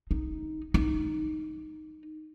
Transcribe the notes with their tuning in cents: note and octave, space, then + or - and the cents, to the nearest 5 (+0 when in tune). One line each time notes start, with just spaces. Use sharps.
D#4 +5
D#4 -5